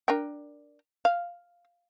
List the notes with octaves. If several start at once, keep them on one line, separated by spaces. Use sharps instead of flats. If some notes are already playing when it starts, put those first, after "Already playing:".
D4 A#4 G5
F5